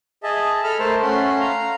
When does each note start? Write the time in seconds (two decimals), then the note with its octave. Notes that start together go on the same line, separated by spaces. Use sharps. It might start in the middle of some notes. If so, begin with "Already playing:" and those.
0.23 G#4 D#5 E5 A5
0.64 A4 B5 F6
0.79 A3 A#4 C5 A5
1.02 A3 C#4 F#5 B5 C6
1.40 F5 A#5